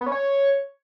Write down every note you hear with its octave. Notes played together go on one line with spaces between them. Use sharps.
B3
C#4
C#5